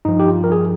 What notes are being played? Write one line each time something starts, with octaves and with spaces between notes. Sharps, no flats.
G2 F3 D#4
G4
F4
A#4
G#4